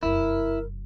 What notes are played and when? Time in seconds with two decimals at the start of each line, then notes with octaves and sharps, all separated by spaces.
0.03 F1 F#2 E4 A#4